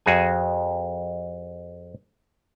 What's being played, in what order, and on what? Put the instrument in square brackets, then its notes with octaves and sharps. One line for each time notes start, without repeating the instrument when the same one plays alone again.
[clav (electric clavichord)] F2 F#4 G#4 G#5